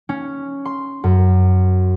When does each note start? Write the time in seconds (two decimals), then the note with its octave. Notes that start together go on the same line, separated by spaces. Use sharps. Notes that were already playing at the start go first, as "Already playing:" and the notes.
0.09 C#4
0.65 C6
1.04 F#2